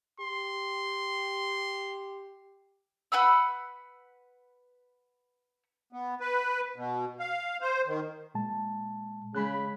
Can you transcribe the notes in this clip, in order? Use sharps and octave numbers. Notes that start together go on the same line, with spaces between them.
G4 C6
B4 F#5 B5 E6
B3
B4
B2
F5
C5
D#3
A#2 G#3 A5
C#3 G#3 B5 F#6